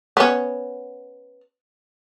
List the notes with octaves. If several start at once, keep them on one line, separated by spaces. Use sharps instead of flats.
B3 C#4